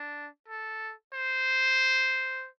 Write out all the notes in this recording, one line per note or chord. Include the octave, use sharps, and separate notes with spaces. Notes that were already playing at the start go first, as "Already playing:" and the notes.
Already playing: D4
A4
C5